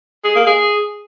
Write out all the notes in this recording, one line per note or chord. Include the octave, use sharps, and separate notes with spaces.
G#4
A#3
G#4